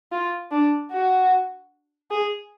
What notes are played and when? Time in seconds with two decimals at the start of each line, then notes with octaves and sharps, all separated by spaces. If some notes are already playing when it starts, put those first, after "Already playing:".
0.12 F4
0.51 D4
0.92 F#4
2.11 G#4